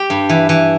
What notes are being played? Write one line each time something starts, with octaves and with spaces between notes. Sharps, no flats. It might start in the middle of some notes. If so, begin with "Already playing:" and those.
Already playing: G4
G2
E3
E3